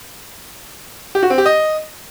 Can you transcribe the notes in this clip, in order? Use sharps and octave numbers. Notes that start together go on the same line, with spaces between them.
G4
F#4
C4
G4
D#5